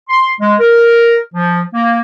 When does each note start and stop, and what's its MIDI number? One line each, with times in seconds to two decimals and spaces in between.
0.09 0.29 84
0.41 0.55 56
0.60 1.17 70
1.34 1.61 53
1.74 2.00 58